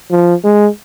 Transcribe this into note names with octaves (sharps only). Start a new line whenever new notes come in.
F3
G#3